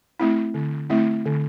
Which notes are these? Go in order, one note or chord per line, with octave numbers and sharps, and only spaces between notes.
A3 C4 E4
D3
A3 C4 E4
D3